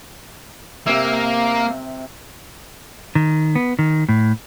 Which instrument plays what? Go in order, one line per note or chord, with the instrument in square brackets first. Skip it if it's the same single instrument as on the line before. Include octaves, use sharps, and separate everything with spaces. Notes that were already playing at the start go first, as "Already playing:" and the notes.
[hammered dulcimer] C3 E5 [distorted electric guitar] A#3
[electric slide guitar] D#3
B3
D#3
A2